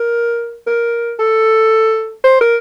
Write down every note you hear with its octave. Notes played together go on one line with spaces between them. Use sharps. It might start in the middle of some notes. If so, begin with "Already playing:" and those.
Already playing: A#4
A#4
A4
C5
A#4